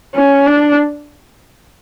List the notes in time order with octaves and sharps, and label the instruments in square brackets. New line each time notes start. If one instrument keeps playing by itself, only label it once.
[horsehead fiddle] C#4
D4